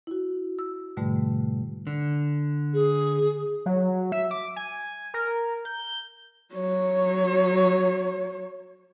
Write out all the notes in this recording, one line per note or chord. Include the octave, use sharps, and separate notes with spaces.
E4 F#4
E6
G#2 B2 D3 G3 A3
D3
G#4
F#3
E5
D6
G#5
A#4
G6
F#3 C#5